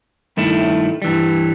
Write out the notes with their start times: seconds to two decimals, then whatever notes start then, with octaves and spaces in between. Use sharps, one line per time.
0.37 G2 D#3 A3 E4
1.02 G2 E3 G3